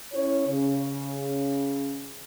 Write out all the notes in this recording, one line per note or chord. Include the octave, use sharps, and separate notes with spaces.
C#4 E4 C#5
C#3